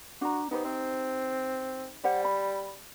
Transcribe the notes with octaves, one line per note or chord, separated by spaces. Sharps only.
D4 F#4 A#5
B3 D#4 G4 C5
C4
G3 C5 D5 F#5
B5